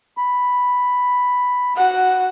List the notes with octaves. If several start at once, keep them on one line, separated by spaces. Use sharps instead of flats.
B5
F#4 F#5